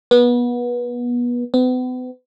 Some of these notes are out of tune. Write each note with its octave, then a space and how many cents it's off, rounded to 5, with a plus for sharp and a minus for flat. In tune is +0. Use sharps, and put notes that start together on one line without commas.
B3 -25
B3 +40